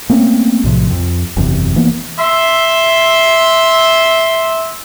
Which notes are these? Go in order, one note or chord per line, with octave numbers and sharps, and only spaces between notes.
A3 A#3 C4 C#4
B1 A2 C3 F3
F2
F#1 E2 C3
E3 A#3 B3
E5 C6